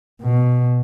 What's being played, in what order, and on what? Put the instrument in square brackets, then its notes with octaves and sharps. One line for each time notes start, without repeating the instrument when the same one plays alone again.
[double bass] B2